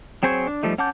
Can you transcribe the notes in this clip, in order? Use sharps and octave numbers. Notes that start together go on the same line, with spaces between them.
F#3 C4 G#4 C5 C#5
D4
F3 G3 A3 D#4
C#4 F#5 A5 D6 G6